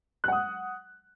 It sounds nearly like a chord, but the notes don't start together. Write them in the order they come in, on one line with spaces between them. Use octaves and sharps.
F#6 F#5 D#6